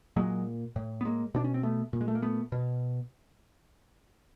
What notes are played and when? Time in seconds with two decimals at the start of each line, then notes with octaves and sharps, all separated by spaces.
0.16 A#2 F#3 G#3
0.76 A2
1.01 B3
1.05 G#3 A#3
1.34 B2 D4
1.44 C#4
1.54 C4
1.63 A3 B3
1.93 A#2
2.01 G#3
2.08 A3
2.15 A#3
2.22 A3 B3
2.52 B2